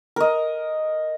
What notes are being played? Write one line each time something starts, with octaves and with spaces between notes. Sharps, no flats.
A#4 D#5